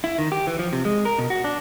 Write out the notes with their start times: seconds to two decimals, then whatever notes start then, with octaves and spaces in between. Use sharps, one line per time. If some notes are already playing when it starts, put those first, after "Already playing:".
0.04 E4
0.18 D#3
0.32 G4
0.47 E3
0.59 F3
0.73 C3
0.85 G#3
1.05 A#4
1.18 B2
1.30 F#4
1.44 D4